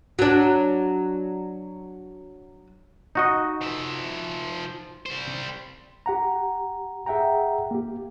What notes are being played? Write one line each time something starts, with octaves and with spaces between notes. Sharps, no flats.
F#3 D4
D#4 F#4 D#5
F3 E5
G3 C5
G4 F#5 A#5
G#4 E5 F#5 G5 A#5
A#3 G4